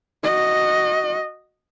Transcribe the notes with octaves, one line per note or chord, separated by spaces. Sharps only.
F#4 D#5